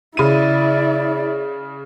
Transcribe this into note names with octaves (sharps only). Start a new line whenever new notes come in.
C#3 E4 D5 D#7